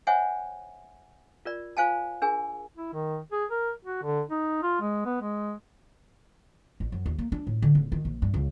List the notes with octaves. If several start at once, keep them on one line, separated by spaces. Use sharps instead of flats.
C5 C#5 E5 F#5 G#5
F4 A#4 D5
F4 C5 F5 G#5 A5
D4 G#4 A#4 G#5
E4
D#3
G#4
A#4
F#4
D3
D#4
F4
G#3
B3
G#3
A1
F#2
D#2
A#3
D4
A2
D3
D1
D#3
A#1
G2
C#2